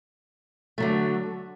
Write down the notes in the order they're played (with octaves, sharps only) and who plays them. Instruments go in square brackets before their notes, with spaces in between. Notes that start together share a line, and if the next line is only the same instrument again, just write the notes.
[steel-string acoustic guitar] D3 F#3 A3